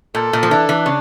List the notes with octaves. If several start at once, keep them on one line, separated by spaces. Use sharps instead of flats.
A#2 A4
A#2
F3
E3 D4
E3
C#3